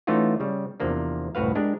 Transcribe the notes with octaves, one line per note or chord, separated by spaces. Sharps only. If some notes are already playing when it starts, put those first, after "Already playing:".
E3 A3 C#4 D#4 F4 F#4
C#3 G3
E2 C3 F3 A#3 D4
C2 F#2 A2 F#4 B4 F5
G#3 D4 G4 A#4